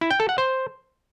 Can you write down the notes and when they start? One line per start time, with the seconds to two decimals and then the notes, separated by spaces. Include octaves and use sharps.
0.01 E4
0.11 G5
0.20 A4
0.29 F#5
0.38 C5